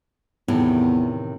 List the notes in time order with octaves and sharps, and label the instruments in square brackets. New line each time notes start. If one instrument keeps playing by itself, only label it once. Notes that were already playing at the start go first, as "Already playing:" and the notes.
[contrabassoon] E2 [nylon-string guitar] A2 C3 D#3